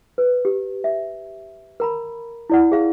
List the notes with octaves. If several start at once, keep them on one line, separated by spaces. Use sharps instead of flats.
B4
G4
E5
A#4 A#5 B5
E4 D5 F#5
G#4 F5